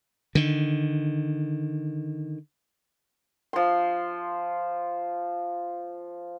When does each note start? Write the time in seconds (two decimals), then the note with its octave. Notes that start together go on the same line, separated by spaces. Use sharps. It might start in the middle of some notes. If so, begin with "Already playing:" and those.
0.35 D3 D#3
3.53 F3 C6